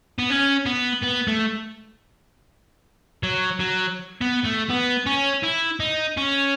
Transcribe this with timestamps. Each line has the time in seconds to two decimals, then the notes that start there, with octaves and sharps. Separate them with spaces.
0.18 B3
0.30 C#4
0.66 B3
1.03 B3
1.28 A3
3.23 F#3
3.60 F#3
4.21 B3
4.45 A3
4.70 B3
5.06 C#4
5.43 E4
5.80 D#4
6.17 C#4